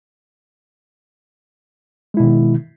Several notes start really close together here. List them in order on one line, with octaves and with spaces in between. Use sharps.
G#3 E4 B2 D#3